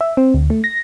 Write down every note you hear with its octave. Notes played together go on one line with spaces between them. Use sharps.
E5
C4
D2
A3
A#6